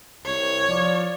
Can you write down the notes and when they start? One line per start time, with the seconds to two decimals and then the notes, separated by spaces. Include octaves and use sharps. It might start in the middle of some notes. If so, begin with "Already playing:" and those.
0.25 C2 C#5
0.68 F3 D5